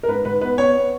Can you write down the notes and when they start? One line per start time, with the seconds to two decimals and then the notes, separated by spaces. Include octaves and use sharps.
0.03 A#4
0.08 G#2 B4
0.25 G#2 B4
0.41 B3 B4
0.58 B3 C#5
0.75 B3